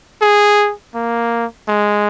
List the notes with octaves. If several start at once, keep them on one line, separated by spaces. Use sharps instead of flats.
G#4
A#3
G#3